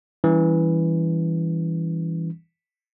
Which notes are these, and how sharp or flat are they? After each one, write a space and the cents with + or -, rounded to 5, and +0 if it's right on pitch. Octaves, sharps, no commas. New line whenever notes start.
E3 +0 G3 +10 C#4 +30